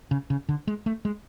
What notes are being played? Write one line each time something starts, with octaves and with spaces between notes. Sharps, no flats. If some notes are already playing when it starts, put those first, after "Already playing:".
C#3
C#3
D3
G#3
A3
G#3